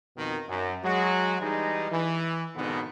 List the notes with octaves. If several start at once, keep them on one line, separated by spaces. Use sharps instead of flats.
F2 B2 D#3
F#2
F#3 G#3 F#4
E3 G3 G#3 D#4
E3
F2 G#2 B2 D3 D#3 B3